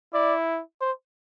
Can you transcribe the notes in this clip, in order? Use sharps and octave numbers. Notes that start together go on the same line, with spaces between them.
E4 D5
C5